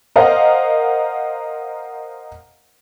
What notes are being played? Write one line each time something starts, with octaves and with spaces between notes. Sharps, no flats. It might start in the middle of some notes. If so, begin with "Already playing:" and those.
A#4 C5 D#5 F5 F#5